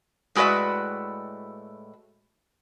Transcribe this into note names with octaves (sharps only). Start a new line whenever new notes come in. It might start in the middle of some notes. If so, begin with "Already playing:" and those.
A2 G#3 F#4 B4 D5 E5